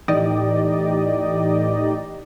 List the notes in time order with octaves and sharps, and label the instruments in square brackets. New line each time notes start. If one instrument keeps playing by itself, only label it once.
[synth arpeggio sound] A2 E3 D#4 G4 D5 D#5